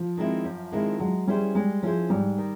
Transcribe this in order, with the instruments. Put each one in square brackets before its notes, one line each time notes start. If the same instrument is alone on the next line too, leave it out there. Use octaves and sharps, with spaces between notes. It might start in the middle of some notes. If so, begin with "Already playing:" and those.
Already playing: [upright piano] F3
[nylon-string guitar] D#3 G#3 C4 E4
F#2
D#3 G#3 C4 E4
[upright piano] F#3 [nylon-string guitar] G#3
[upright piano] G3 [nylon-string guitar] C#4 E4 G#4 C5
[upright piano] G3 [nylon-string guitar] G#3
[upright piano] F3 [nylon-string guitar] C#4 E4 G#4 C5
[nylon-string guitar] G#2 [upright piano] G3
[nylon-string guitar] D#3